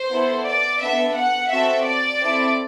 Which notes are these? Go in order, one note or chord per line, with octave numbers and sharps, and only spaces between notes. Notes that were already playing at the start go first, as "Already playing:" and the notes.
Already playing: C5
B3 E4 A4
D5
B3 D4 A4 E5
F#5
C4 F#4 A4 E5
D5
C4 E4 A4